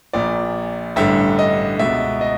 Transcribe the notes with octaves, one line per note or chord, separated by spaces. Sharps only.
A#1 A#2 D5
A1 G2 D3 E5
D#5
C#2 B2 E5
D#5